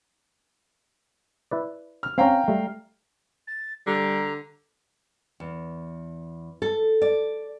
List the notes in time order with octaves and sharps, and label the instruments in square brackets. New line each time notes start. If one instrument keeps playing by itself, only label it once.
[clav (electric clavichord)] E4 B4 D5
[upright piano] F6
[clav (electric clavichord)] C4 C#4 [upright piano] F5 G5 A#5
[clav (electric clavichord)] G3 A3
[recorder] A6
[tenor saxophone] D3 [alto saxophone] G3 [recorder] A#5
[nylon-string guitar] E2
A4
D5